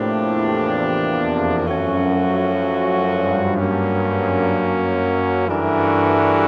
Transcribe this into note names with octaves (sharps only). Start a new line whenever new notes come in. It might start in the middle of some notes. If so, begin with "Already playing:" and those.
Already playing: A2 C3 F3 A#3 D4 G4
E2
F2
F#2 F3 A3 C#4 F#4
G2
F#3 A#3 C#4
F#2
G2 E3 A3 D4 F#4 A#4
G2